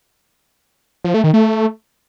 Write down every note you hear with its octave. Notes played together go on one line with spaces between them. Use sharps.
F3
A3
D#3
A3